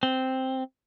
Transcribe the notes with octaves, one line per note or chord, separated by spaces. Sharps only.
C4